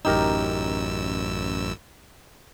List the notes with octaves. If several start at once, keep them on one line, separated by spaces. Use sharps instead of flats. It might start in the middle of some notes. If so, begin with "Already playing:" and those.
A1 F#2 D#4 G4 A#4 E6